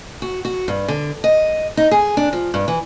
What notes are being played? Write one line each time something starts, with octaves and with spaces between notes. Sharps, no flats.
F#4
F#4
G2
D3
D#5
D#4
G#4
D4
F3
G2
E3